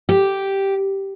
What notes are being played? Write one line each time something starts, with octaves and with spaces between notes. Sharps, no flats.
G4